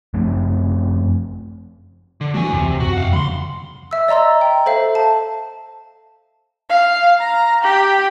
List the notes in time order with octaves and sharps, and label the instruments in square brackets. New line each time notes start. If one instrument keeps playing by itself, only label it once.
[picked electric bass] F#2 F3 A3 C4
[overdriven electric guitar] D3
[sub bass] E3 [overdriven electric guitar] F#4 G#5
[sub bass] D2 [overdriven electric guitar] C3
[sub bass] F#2 [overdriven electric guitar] F#4
[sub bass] F2 [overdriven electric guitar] F5 F#5
[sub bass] C#3 [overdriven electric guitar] B5 C6
[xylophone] E5 E6
D5 D#5 A#5 C6 E6
G5
A4 C5 E5 F5
A5
[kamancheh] F5
A#5
G4